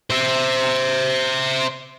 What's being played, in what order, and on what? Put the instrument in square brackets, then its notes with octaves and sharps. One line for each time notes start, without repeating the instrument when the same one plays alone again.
[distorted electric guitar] C5 E5